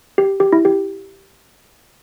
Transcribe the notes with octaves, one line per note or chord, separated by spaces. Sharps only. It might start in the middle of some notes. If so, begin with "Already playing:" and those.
G4
G4
E4
G4